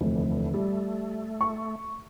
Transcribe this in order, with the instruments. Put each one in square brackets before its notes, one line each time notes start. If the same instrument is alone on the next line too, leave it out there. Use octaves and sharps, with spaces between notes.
[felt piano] F1 [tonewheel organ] D#2 D3 E3
[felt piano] G3 [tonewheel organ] A3
[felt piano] C#6